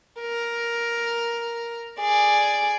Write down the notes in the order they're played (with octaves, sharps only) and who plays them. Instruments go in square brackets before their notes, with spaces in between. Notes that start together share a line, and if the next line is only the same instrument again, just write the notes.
[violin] A#4
G#4 D5